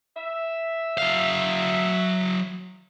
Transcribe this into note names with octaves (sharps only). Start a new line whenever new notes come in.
E5
F#3 F5